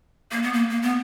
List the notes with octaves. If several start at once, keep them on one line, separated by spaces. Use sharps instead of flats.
A#3
B3
A#3
A#3
B3